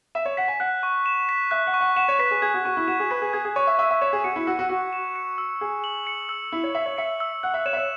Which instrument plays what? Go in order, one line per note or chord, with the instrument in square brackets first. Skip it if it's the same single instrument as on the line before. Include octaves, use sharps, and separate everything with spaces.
[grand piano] E5 [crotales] E7
[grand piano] C#5
[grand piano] F#5 [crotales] B6
[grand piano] G#5
[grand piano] F#5 [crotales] F#6
[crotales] C#6
E7
B6
[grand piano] E5 [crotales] F#6
[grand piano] F#5
[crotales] C#6
[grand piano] F#5
[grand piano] F#5 [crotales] E7
[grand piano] C#5
[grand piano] B4 [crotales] B6
[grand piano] G#4
[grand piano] G#4 [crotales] G#6
[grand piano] F#4
[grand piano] F#4 [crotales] C#6
[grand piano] E4
[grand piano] F#4 [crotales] E7
[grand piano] G#4
[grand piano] B4 [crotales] B6
[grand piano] G#4
[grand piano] G#4 [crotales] G#6
[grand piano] G#4
[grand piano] C#5 [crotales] C#6
[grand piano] E5
[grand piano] E5 [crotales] E6
[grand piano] E5
[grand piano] C#5 [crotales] E7
[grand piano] G#4
[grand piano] F#4 [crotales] C#7
[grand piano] E4
[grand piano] F#4 [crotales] E6
[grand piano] F#4
[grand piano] F#4 [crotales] E6
[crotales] E7
C#7
E6
[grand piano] G#4 [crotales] E6
[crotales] F#7
C#7
E6
[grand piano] E4 [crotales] E6
[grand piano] C#5
[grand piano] E5 [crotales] F#7
[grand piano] C#5
[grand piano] E5 [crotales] C#7
[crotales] E6
[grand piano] F#5 [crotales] F#6
[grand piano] E5
[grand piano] C#5 [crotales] E7
[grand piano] E5
C#5